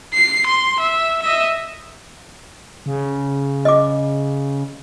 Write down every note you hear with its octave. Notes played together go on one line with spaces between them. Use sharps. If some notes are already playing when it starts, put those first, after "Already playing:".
C7
C6
E5
D#5 E5
C#3
D#5 D6